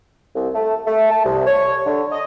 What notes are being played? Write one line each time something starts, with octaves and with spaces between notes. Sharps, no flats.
C2
A3
A3
A5
C2
C#5
D3
D#5